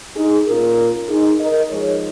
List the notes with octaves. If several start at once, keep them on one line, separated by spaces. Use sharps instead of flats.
D#4 G#4
A#2 A#3 C#4 F4 A#4
D#4 G#4
A#4 D#5
F3 G#3 D#4 G#4 C#5